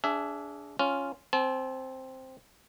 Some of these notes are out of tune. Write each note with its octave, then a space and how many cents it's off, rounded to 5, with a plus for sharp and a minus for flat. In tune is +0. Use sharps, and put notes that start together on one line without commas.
D4 -20 G#4 +0 E5 +15
C#4 +0 F4 +0
C4 +0 A5 -40